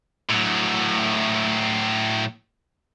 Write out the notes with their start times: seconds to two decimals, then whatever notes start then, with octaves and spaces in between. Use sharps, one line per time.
0.29 A2 F#3